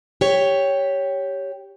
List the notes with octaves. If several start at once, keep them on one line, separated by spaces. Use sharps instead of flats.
G4 C#5